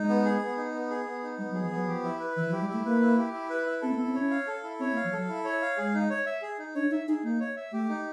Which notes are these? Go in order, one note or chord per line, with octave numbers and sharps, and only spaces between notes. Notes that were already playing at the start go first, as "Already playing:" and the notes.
Already playing: G#3 D#4
B3
G#4
B3
D#4
B3
G#4
B3
D#4
G3 B3
F#3
G#4
F3
F#3 B3
F3 G4
E4
B4
E3 E4
F3
G4
G3
A3 E4
A#3 B4
E4
G4
E4
B4
E4
C4 A4
A#3
B3
E4
C4
C#4 C#5
F5
A4
E4
C4 C#5
A#3
F5
F3
F#3 A4
E4
C#5
F5
G#3 G#4
D#4
C#5
E5
G#4
D#4
D4 C#5
D#4 E5
D#4 G#4
A#3 D#4
C#5
E5
A3 G4
D#4